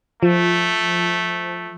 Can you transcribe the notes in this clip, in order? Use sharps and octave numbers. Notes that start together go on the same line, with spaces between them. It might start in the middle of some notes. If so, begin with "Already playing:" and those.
F3 A3